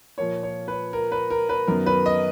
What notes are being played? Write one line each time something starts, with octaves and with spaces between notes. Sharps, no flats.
A#2 F3 A#3 C#5
C#5
B4
A#4
B4
A#4
B4
F#2 D#3 F#3 B3 A#4
B4
D#5